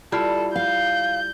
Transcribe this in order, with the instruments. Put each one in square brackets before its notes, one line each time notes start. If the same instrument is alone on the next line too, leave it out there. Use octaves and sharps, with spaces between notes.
[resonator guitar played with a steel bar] G3 E4 F4 [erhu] A4
[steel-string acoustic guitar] F5 [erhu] G6